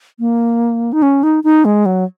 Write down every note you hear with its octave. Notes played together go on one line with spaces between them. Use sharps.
A#3
D#4
C#4
D#4
D#4
G#3
F#3